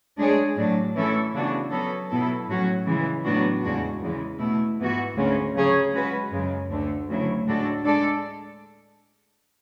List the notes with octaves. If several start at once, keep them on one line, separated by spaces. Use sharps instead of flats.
G#3 D4 G#4 C#5
A2 F#3 A3 D4
E3 A3 C#4 E4 A4
C#3 E3 B3 D4 F#4
F#3 B3 F#4 A4 C#5
B2 F#3 B3 E4 A4
A2 F#3 C#4 F#4
C#3 E3 G#3
A2 F#3 B3 D4 F#4
E2 C#3 G#3 D4 F#4
E2 C#3 E3 G#3
B2 A3 E4
G#2 E3 B3 F#4
D2 C#3 G#3 C#4
C#3 F#3 C#4 G#4 C#5
G#3 C#4 F#4 B4
F#2 C#3 G#3
D2 D3 A3
D2 C#3 F#3 A3 E4
A2 G#3 D4 F#4 A4
G#3 D4 A4 D5